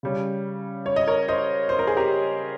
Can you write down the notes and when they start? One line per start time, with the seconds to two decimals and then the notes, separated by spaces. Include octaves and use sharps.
0.03 C#3 G3 C#4
0.86 C#5
0.96 D#5
1.07 A#4 C#5
1.28 C5 D#5
1.69 C5
1.79 A#4
1.87 G#4
1.97 G4 A#4